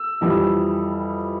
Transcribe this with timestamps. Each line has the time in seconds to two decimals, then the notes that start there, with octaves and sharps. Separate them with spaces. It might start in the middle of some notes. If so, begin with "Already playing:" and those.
Already playing: E6
0.21 F2 E3 G3